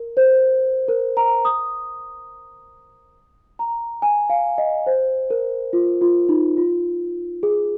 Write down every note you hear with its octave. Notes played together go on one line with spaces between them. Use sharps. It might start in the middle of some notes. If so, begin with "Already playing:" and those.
Already playing: A#4
C5
A#4
A#5
D#6
A#5
G#5
F5
D#5
C5
A#4
F4
F4
D#4
F4
G#4